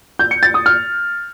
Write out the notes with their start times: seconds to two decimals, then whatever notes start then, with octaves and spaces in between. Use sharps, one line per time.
0.19 G6
0.31 C#7
0.43 A6
0.54 D#6
0.66 F6